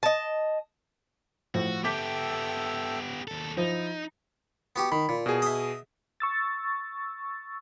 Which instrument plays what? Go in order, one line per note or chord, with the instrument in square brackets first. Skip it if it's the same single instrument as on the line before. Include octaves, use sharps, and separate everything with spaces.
[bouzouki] D#5 A5
[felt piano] A2 F3 [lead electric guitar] F#4
[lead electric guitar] B3 G4 [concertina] A4 E5 G5 [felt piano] D6 G6 B6
[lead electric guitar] D#2 A4
[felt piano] F3 [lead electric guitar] D#4 [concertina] E4
[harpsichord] B3 F#4 G4
[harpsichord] D#3 [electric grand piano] B5
[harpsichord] A#2
[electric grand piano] B2 G#4
[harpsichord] D#5 E5
[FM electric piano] C#6 E6 A6